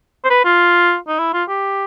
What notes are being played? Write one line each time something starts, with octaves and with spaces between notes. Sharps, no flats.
C5
B4
F4
D#4
E4
F4
G4